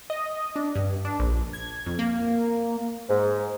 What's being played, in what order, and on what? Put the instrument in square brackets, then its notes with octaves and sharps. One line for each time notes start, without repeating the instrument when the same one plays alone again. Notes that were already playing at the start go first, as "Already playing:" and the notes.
[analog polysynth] D#5
D4
G2
D4
A#1
G#6
F2
A#3
[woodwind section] G#2